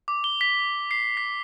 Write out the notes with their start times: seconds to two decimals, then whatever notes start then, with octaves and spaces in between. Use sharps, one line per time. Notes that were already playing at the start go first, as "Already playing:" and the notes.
0.08 D6
0.24 G7
0.41 B6
0.91 C7
1.17 B6